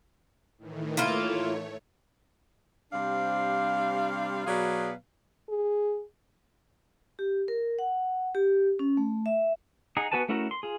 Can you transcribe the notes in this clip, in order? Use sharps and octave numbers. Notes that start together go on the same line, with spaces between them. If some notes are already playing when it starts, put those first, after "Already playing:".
A2 D#3 E3
A3 A#3 E4 F4 C#5
C3 G3 D4 C5 F5
B2 F#3 G#4 B4 D5 F5
G#4
G4
A#4
F#5
G4
C#4
A3
E5
D#4 G#4 F#5 A#5
B3 F#4 B4 G#5 A5
A3 C#4 E4 F#4 A#4
C6
F4 G#4